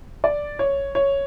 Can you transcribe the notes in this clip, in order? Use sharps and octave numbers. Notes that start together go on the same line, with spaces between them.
D5
C#5
C#5